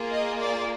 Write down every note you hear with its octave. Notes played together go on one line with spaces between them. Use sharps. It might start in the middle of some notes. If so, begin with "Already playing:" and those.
Already playing: A#3 F4 G#4
D#5
D5